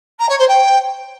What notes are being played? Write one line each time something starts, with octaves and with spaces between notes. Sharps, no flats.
A#5
C#5
C5
G5